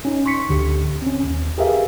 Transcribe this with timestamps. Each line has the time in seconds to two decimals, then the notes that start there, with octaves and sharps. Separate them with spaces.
0.05 C#4 D#4
0.26 C6 C#6 B6 C#7
0.49 D2 D3 G4
1.02 C4 C#4
1.23 D#2
1.58 G4 G#4 A#4 B4 E5 F5